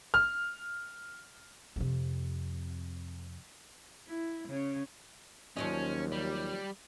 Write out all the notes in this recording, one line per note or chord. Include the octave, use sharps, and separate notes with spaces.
F6
F2 C3
E4
C#3 C#4
D#2 F3 F#3 C#4 D#5
G3